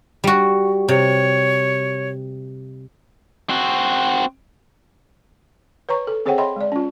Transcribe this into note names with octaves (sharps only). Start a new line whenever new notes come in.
G3 F#4
C3 C#5
C4 F#4
B4 C#5 A#5 C#6
A4
C4 G#4 C5 C#5 F#5 G5
C#5 D#5 E5 G5 B5 C6
G#3 D5
C#4 F4